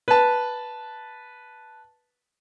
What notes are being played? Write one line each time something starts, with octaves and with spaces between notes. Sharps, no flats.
B4 A5